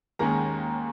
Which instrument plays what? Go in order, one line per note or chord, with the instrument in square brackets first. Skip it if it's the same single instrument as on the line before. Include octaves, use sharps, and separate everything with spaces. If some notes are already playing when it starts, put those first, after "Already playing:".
[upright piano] D#2 D#3 G#3 C#4 A#4 A#5